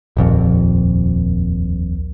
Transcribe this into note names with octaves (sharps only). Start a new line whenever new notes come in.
D#1 A#1 F2